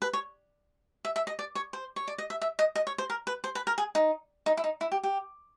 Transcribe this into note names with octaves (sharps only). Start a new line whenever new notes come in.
B4
C#5
E5
E5
D#5
D5
C#5
C5
C#5
D5
D#5
E5
E5
D#5
D#5
C#5
C5
A#4
B4
C5
B4
A#4
G#4
D#4
D#4
E4
D#4
E4
G4
G4